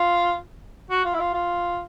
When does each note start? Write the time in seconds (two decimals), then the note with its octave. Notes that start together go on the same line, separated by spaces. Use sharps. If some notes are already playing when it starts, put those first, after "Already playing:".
Already playing: F4
0.90 F#4
1.05 F4
1.14 E4
1.20 F4
1.34 F4